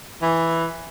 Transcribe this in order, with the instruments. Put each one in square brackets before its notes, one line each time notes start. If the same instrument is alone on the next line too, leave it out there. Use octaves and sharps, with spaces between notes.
[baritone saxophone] E3